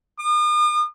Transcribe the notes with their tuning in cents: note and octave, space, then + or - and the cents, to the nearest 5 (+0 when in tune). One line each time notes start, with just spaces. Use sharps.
D#6 -45